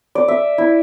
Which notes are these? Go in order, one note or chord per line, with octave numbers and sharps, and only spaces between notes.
D5
E5
E4